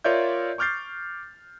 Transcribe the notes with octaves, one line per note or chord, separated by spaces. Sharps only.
F4 A#4 C#5 D5 E5 G6
C#6 D6 F6 G6 A6 C7